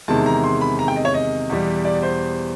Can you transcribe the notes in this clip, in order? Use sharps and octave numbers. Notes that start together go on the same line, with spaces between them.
E2 C3 D#3 G#3 A5
A#5
C6
B5
A#5
G5
D#5
C#5
D#5
E2 B2 G3
D5
C5